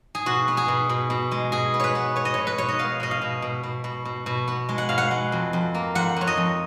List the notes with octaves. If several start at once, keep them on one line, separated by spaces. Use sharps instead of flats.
G#4
B2 F#4
B3
G#4
B2
B2
B2
G#3
B2 G#4
B3
B4 C#5
B3
B3 C#5
D#5
B2 C#5
B4
B2 C#5
D#5
B3 F5
B2 D#5
F5
B2
B2
B2
B2
B2
B2
B3
G#3
F#5
B2 F5
F#5
G#3
F2
F2
A#3
F2 F#5
F2 C#5
D#5
F2